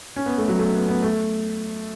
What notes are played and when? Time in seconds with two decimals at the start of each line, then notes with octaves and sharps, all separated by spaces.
0.16 C#4
0.26 B3
0.38 A3
0.48 F#3
0.59 A3
0.74 B3
0.88 B3
1.03 A3